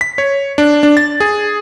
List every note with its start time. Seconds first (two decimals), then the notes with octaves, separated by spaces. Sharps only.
0.01 B6
0.18 C#5
0.58 D4
0.83 D4
0.97 A6
1.20 G#4